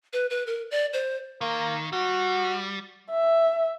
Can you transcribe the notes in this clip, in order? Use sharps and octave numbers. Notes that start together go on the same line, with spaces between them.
B4
B4
A#4
D5
C5
D#3 A#3
G3 F#4
E5